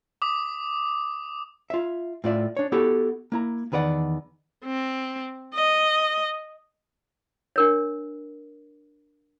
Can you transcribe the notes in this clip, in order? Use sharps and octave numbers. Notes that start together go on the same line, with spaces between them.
D6 D#6
F4 E5
A2 F4 D5 E5
D4 C#5
B3 E4 F#4 G4 A4
A#3 E4 A#5
E2 D#3 B4 D5 F#5
C4
D#5
D4 A#4 C#5